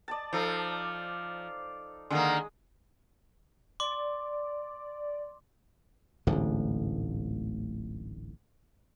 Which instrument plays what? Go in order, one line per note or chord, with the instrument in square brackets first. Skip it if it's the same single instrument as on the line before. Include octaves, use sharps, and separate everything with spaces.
[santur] D5 D#5 A5
[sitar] F3 [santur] D#4 A4 D5
[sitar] D3 D#3 A#3 [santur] G#3 D#6
[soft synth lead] D5 [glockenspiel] C6 D6
[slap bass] D1 A1 G#2 D3